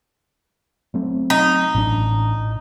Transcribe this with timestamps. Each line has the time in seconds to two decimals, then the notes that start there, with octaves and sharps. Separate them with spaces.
0.94 F#3 A3 C4
1.30 D#4
1.75 A1 A2 D4